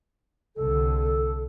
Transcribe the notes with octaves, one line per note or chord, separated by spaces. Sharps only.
C2 D3 A4
A4